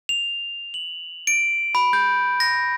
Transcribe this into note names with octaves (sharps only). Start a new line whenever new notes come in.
F7
F#7
D7
B5
G6
A#6